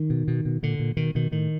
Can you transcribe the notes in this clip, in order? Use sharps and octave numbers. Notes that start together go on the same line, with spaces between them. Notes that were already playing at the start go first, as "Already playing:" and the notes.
Already playing: D#3
B2
B2
B2
A#2 D3
A#2
B2 D#3
B2 D#3
A2 D#3